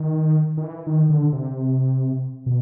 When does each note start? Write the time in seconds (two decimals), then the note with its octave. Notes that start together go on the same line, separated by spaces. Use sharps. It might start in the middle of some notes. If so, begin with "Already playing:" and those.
Already playing: D#3
0.57 D#3
0.64 E3
0.87 D#3
1.10 D3
1.33 C3
2.46 B2